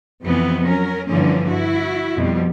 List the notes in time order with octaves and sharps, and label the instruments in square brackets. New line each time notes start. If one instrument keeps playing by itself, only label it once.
[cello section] F2 C3 E3 B3
F#3 C#4 A#4
G2 D3 E3 F3 A#3 C#4
E4 F#4
F2 B2 G3